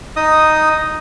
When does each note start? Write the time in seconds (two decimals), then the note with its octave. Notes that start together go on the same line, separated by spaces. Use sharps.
0.16 D#4 D#5 D#6